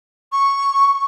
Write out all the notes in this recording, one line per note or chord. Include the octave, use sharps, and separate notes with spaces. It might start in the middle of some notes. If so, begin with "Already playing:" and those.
C#6